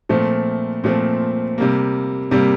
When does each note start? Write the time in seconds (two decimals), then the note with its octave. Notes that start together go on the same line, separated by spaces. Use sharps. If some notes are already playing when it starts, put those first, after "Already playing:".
0.09 A#2 F3 A3 C4
0.84 A#2 F3 A3 C4
1.58 C3 G3 A#3
2.31 C3 G3 A#3